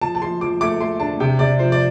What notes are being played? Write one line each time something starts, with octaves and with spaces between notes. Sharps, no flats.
F3 A5
A5
F3 C6
F3 D6
A3 D6
A3 C6
D4 A5
C3 G5
C3 D5
F3 C5
D5